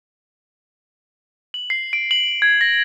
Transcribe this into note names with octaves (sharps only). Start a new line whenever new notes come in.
F#7
C7
D7
F#7
G#6
A#6